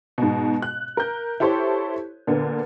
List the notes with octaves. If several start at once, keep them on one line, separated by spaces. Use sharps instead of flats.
G#2 B2
F#6
A#4 G6
E4 G4 A4 C5 C#5
A#2 D3 B3